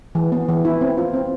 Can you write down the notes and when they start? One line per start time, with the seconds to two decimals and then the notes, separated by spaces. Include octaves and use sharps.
0.15 E3
0.32 B3
0.49 E3
0.65 E4
0.81 C4
0.98 F4
1.14 C4